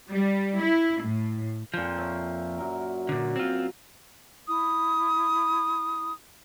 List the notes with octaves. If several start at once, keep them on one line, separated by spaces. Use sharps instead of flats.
G3
E4
A2
F2 A#2 F3 C6
C#5 E5
F#2 A#4
A#2 D3
C4 F4
E4 D#6